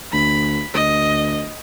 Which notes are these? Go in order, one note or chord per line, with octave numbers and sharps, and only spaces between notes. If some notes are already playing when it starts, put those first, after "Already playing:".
D2 B5
D2 D#5